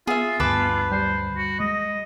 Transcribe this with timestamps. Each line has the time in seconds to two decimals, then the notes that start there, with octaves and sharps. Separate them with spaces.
0.07 B3 F4 G#4 E5
0.40 D2 G2 B4 A5 D6
0.91 G3 C5
1.37 F#4
1.60 G#3 D#5